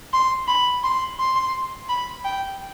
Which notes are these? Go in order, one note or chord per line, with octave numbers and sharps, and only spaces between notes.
C6
B5
C6
C6
B5
G5